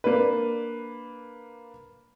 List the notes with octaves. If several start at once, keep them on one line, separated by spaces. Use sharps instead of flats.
A#3 D4 B4